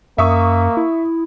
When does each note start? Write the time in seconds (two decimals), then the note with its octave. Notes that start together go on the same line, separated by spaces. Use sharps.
0.18 F#2 A#3 E5 C#6 D#6
0.77 E4